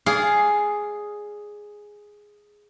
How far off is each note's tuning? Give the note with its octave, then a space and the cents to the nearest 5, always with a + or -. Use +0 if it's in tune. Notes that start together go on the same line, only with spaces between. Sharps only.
G#4 +0 D5 -25 F5 +0